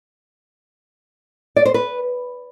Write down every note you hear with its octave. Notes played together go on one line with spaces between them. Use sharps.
D5
C5
B4